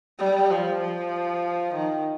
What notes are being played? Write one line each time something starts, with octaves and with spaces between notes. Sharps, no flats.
G3
F3
F3
D#3